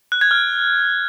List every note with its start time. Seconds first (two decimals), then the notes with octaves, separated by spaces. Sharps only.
0.12 F#6
0.21 G#6
0.31 F6